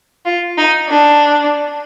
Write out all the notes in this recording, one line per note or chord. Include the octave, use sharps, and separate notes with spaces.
F4
D#4
D4